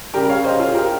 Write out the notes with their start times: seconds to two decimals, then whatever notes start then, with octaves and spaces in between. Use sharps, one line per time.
0.13 C#3 G3 G4 A#4
0.29 C#5 F5
0.44 C5 D#5
0.59 F4 G#4
0.75 G4 A#4